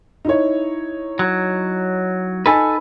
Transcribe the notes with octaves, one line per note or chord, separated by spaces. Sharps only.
D#4 E4 C#5
F#3
D#4 A4 B4 G#5